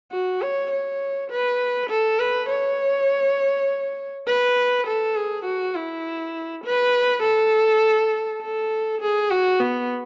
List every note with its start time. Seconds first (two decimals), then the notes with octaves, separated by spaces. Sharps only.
0.12 F#4
0.42 C#5
0.71 C#5
1.30 B4
1.90 A4
2.19 B4
2.49 C#5
4.27 B4
4.86 A4
5.16 G#4
5.45 F#4
5.75 E4
6.64 B4
7.23 A4
8.42 A4
9.01 G#4
9.31 F#4
9.60 B3